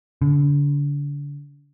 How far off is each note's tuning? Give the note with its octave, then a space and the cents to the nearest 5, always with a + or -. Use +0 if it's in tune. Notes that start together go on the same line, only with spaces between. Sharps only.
D3 -35